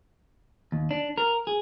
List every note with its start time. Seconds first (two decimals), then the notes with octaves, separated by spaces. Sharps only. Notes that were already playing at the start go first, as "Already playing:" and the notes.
0.72 D#2
0.91 D4
1.18 A#4
1.47 G#4